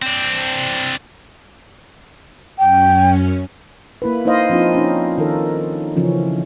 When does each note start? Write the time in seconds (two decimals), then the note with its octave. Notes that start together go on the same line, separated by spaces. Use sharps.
0.02 C4 D4
2.59 F#2 C#4 G5
4.02 A#3 E4 B4
4.25 A#3 D#4 E4 C5 D#5 F5
4.50 F3 C4 D4 D#4 F4
4.75 C#4 D#4
5.18 D#3 D#4 A4 A#4
5.96 C#3 E3 F3 C#4